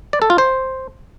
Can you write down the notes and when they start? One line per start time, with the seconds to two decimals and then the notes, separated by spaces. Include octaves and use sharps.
0.13 D5
0.22 A4
0.30 F4
0.38 C5